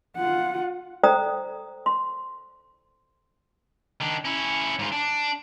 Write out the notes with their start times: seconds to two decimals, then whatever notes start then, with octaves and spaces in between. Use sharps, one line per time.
0.17 F4 F#5
1.03 A4 C5 D5 G5 A#5 D#6
1.86 C6
4.01 D#3 D4
4.25 C#4 E4
4.79 G#2 F4
4.92 D4